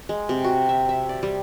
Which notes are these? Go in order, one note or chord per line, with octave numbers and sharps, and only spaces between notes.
G#3
C3
F#4
E5
E5
D5
G3